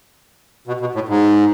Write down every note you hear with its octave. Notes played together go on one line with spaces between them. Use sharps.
B2
B2
A2
G#2